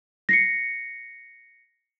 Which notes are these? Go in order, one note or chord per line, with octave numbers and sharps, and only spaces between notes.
A#6 C7 C#7